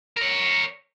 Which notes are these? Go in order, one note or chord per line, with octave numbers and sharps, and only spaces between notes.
A#4 C#5